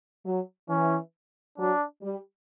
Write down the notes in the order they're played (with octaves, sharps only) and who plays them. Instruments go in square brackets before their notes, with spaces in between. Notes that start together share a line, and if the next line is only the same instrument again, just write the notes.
[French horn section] F#3
[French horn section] E3 [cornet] C#4
[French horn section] F#3 [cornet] D4
[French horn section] G3